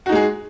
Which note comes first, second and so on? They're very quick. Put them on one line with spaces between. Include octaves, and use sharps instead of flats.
F#4 D#4 G#3 G#4